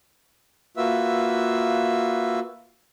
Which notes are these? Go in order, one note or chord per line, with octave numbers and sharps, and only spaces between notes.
A#3 F4 F#4 B4 E5 E6